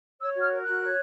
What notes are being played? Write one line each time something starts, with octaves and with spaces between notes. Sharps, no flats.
C#5 E6
F#4
F6
A#4
F#6
F#4
C#5